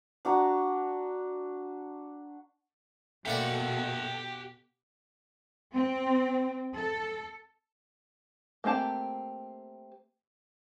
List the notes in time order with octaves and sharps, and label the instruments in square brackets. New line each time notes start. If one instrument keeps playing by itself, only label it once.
[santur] D4 F#4 A#5
[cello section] B2 A4 [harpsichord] A3 A#3 D5 [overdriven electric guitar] G4 F#5
[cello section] C4
A4
[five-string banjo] A3 A#3 C4 G4 A5